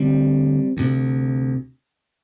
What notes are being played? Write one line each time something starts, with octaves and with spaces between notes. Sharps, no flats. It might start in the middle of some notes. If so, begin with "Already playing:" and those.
Already playing: D2 D3 G3 C4
D2 C3